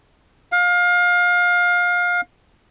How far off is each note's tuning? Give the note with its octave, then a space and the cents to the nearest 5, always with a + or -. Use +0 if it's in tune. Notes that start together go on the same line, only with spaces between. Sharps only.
F5 +25